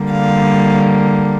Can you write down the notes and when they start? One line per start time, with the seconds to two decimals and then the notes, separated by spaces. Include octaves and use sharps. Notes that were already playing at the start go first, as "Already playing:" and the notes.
Already playing: D3 G3 A#3
0.12 F5